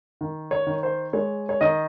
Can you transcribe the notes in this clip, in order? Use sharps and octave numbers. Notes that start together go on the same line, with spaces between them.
D#3
C#5
D#3
C5
G#3 C#5
C#5
D#3 D#5